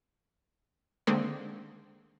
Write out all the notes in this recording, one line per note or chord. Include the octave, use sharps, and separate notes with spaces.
D3 D#3 G#3 A#3 C4